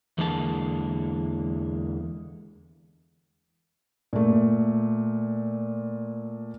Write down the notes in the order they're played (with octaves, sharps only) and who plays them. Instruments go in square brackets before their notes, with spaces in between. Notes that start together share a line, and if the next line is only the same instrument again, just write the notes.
[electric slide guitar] E2 D3 E3 G#3 A#3 A5
[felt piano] A#2 A3